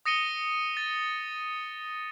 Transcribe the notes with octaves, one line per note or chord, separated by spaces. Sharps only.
D#6 A#6 C#7 D#7 G7
A6